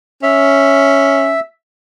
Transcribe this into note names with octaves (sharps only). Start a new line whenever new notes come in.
C#4 E5